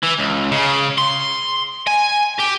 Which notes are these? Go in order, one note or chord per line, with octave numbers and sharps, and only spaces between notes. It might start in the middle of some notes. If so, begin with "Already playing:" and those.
E3
C#2
C#3
C6
G#5
G4